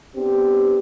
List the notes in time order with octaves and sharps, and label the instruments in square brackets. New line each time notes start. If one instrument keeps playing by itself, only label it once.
[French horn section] B3 C4 D4 G4